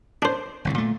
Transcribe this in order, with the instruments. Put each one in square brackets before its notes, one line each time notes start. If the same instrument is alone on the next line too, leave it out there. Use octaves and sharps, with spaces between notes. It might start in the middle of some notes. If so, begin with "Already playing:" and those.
[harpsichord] D4 C5
[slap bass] G1 C2 A2
A#2 A3